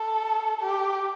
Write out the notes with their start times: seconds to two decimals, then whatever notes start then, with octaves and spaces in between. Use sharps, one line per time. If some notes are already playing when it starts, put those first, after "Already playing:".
Already playing: A4
0.61 G4